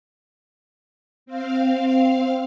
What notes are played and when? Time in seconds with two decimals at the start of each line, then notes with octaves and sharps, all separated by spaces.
1.26 C4 F5